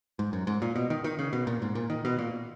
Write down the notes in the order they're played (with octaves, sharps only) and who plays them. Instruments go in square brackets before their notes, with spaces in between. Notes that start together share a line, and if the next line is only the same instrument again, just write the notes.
[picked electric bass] G#2
F#2
G#2
A#2
B2
D#3
D#3
C#3
B2
A#2
G#2
A#2
D#3
B2
A#2